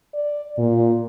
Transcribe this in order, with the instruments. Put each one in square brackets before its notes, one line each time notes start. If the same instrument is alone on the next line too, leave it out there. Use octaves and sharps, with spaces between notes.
[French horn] D5
A#2